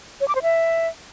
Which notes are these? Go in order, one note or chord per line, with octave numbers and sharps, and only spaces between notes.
C#5
D6
C5
E5